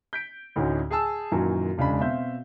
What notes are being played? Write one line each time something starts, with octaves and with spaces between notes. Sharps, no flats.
G6 B6 D7
D2 A2 D3 C#4 D#4 F#4
G#4 G#5 A5 E6
F#2 A#2 D#3 E3 F#3
E1 C#3 G#3 D4 B5
B2 C4 E5 F5 G6